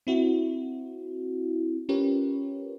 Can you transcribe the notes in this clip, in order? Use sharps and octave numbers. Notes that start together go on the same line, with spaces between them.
C4 E4 F#4
C#4 F4 G4 A#4 B4 C#5